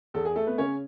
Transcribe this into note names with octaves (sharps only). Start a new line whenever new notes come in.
E2 A4
G#4
A3 A4
B3 B4
C#3 C#4 C#5